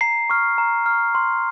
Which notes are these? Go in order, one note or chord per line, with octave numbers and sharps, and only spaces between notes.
A#5 C7
C#6 F6
A#5
C#6 F6
C6